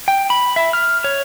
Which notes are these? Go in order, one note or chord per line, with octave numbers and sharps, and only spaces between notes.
G5
B5
E5
F6
C#5